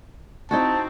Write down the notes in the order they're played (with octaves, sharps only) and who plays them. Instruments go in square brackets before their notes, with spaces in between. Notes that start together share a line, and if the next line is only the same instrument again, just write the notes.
[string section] C4 [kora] D#4 E4 F#4 [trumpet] A5